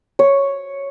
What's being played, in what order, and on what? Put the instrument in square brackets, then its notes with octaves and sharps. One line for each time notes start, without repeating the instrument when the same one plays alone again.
[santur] C#5